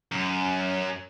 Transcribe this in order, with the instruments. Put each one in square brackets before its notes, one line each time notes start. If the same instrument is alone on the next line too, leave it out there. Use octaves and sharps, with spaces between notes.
[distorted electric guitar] F#2